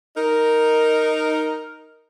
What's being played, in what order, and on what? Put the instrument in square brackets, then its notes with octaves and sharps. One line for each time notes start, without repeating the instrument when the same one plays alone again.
[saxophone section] D#4 A#4